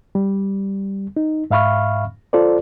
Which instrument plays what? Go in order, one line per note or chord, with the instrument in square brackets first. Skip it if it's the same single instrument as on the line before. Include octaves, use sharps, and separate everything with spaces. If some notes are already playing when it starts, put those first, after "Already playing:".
[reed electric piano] G3
D#4
G#2 E5 F5 B5 C#6 F6
F4 A4 C5 D5